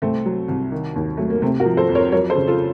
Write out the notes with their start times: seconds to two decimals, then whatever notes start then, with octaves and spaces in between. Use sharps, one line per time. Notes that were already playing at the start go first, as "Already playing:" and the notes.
0.02 C2 A3 C4
0.26 F#3
0.48 C2
0.72 D#3
0.96 D#2
1.17 F#3 A3
1.30 A#3
1.42 C3 A3 C4
1.60 F#4 A#4
1.66 F3
1.77 A4 C5
1.89 F2
1.95 A#4 C#5
2.12 F#3 A#4 C#5
2.30 A4 C5
2.36 C#3
2.47 F4 A4